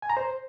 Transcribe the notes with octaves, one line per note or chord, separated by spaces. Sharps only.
G#5
A#5
C5